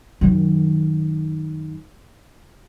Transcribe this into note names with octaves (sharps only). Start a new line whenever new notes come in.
F#2 D#3